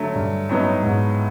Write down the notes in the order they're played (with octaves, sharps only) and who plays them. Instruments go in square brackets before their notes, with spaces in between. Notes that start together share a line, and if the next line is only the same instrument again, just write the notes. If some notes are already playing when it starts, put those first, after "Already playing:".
Already playing: [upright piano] D3 F#3 A3
[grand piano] G2
[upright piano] A2 F#3 B3 D#4
[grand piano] G#2